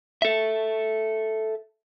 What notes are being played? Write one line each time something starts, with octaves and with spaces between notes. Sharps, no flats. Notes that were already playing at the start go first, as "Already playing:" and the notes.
A4 E5